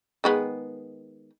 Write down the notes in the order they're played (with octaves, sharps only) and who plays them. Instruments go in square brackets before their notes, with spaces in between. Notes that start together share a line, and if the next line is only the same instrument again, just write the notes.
[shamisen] D#3 G#3 B3